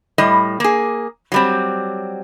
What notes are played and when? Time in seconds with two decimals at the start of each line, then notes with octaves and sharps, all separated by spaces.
0.18 A2 G3 D#5
0.60 A#3 G#4
1.32 F#3 G3 C4